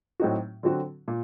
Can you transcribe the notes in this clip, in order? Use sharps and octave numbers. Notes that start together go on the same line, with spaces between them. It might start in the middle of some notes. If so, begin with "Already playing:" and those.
A2 F#3 C4 D#4 F#4
D3 F#3 C4 F#4
A#2